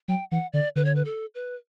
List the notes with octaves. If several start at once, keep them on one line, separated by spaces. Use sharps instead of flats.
F#3 G5
E3 F#5
D3 D5
D3 B4
C#5
B4
A4
B4